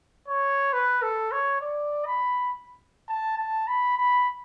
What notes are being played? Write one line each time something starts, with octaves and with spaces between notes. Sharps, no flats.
C#5
B4
A4
C#5
D5
B5
A5
A5
B5
B5